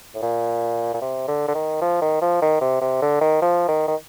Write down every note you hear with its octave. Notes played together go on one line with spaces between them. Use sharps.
A2
A#2
A#2
C3
D3
D3
D#3
F3
D#3
F3
D#3
C3
C3
D3
D#3
F3
D#3
D#3